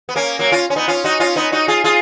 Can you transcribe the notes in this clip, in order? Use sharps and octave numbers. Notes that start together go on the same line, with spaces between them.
B3
A#3 C#4
F#3 A#3
C#4 F4
C#4
B3 D#4
C#4 F4
D#4 F#4
C#4 F4
B3 D#4
D#4 F#4
F4 G#4
F4 G#4